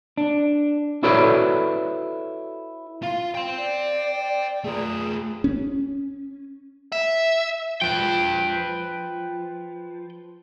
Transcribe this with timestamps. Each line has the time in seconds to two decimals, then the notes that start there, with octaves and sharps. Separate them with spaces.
0.18 D4
1.03 E4 F#4 A4 B4 C#5 D5
3.03 F4 F5
3.35 G5 C6
3.58 D5
4.64 A3 F4 G#4
5.44 C#4
6.92 E5
7.81 F3 B4 G5